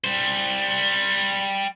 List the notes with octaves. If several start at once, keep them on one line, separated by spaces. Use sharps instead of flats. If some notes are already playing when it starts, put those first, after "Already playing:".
G3 C5